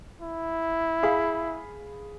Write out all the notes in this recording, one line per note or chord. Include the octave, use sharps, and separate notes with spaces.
E4
G#4 F5 B5